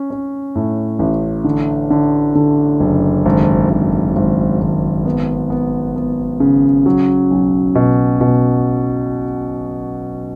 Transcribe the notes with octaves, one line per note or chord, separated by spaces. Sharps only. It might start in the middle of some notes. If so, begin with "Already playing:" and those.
Already playing: C#4
C#4
A2
A1
D3
D3
D3
F#1
G#1
G#1
G#1
G#1
B3
B3
B3
C#3
F#3
B1
B2
B2